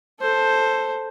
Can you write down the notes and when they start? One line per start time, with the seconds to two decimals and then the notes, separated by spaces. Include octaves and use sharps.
0.19 A4 C5